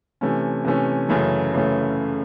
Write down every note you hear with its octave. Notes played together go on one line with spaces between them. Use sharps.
C3 E3 A3 C#4
C3 E3 A3 C#4
F#2 C#3 E3 A3
F#2 C#3 E3 A3